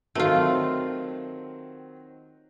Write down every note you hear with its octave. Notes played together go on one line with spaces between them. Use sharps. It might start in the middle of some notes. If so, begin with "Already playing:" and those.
D#3 F#3 A3 C4 F4